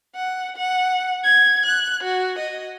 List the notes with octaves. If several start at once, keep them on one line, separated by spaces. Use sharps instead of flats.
F#5
F#5
G#6
F#6
F#4
D#5